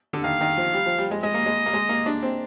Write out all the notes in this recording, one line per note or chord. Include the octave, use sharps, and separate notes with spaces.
D3
D#3 F5
D#3
F3
G3
F3
G3
G#3
G#3 D#5
A#3
G#3
A#3
G#3
A#3
D4
C4